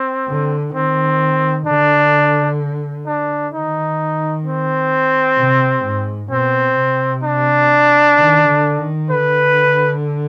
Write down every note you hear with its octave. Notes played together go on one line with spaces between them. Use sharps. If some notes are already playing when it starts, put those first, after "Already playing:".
Already playing: C4
D3
D#3 C4
D3 D4
D4
D#3 D#4
C4
C3
G#2
B2 C4
C3
D4
D#3
D3
D#3
D3 B4